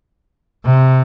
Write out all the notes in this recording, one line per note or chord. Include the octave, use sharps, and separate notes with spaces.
C3